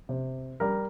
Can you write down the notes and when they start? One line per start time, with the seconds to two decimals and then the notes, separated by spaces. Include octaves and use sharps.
0.09 C3
0.60 G3 A#4